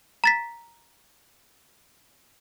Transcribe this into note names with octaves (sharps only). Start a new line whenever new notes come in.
A#5 A6 B6